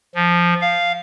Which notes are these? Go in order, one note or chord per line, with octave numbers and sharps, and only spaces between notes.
F3
F5